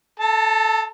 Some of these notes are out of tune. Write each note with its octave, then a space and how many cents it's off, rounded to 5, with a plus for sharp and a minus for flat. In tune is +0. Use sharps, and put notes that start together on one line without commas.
A4 -10 A5 +35